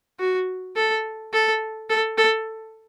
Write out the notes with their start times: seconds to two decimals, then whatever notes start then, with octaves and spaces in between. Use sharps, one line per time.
0.19 F#4
0.76 A4
1.33 A4
1.90 A4
2.18 A4